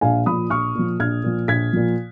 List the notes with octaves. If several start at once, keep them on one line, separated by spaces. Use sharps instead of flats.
A#1 F5 G#5
A#2 F3 B5 D#6
A#1 C#6 F6
A#2 F3
A#1 F6 G#6
A#2 F3
A#1 G#6 B6
A#2 F3